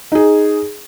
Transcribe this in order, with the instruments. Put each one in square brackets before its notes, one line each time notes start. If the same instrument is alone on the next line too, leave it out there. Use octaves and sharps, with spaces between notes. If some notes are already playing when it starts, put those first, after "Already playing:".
[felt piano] D#4 G#4